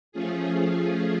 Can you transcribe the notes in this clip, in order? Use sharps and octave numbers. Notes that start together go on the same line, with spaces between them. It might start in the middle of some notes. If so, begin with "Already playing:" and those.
F3 A3 C#4 F4 G#4